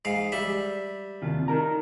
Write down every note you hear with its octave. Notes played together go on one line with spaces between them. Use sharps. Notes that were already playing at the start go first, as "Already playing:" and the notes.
G#2 F5
G3 E5
D#2 C3 F4
D#4 A#4 A#5